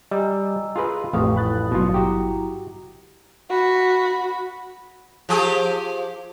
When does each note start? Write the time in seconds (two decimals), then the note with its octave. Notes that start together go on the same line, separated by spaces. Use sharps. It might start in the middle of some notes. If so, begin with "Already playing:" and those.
0.11 G3 D#5 G#5 A#5 E6
0.76 F4 G#4 B4
1.13 A1 F2 A3 G4 F5 C#6 D#6
1.36 E4 B5 D#6 F#6 A6
1.71 G#1 G2 B2 F#3 F4
1.94 E4 F#4 G4 A#5
3.50 F#4 B5
5.29 F3 G4 G#4